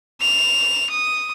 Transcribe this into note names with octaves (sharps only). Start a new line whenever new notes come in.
E7 F7
D#6